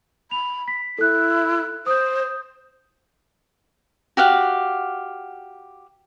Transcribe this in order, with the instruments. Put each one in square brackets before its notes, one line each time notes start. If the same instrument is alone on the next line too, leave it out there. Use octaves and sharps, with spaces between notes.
[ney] B5 [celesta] F7
[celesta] B6
[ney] E4 [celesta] A4 F#6
[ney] C5 [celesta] D#6 G6
[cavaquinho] F#4 G4 F5 F#5